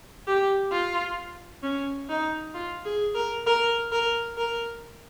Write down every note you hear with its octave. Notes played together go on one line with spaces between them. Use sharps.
G4
F4
C#4
D#4
F4
G#4
A#4
A#4
A#4
A#4